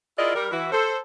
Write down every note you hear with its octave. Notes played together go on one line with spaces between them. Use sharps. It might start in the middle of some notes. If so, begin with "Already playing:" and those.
E4 F4 G#4 A#4 D5 D#5
G3 A#4
E3 E4 F#4
A4 C5